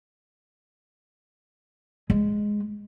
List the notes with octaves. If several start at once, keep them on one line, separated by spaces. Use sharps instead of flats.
G#3